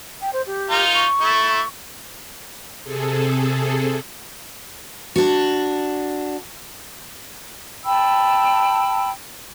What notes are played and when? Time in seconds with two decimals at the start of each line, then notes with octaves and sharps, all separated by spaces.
0.21 G5
0.33 C5
0.46 G4
0.70 D#4 F4 A#4
0.94 C#6
1.21 A3 E4
2.84 C3 G#4 A4
5.16 D4 F#4
7.84 G5 A5 B5 E6